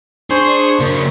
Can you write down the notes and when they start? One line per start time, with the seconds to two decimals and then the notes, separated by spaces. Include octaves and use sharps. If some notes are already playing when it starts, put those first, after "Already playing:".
0.31 D4 G#4 C5 C#6
0.80 C#3 A#3